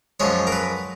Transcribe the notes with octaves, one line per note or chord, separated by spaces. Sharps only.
F#2 F3 G#3 C#5
A#4
B4